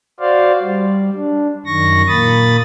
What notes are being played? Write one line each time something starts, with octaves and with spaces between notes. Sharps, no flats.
F#4 C5 D5 F5
G3
D4
F#2 D#3 C#6 A#6
A#2 A#3 B5 D#6 A6